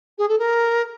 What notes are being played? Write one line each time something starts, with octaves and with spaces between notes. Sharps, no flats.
G#4
A4
A#4